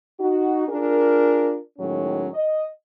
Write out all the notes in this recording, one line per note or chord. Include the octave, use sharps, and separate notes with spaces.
D#4 F#4
D4 F4 G#4 A#4
A2 D#3 F#3 G#3 C#4
D#5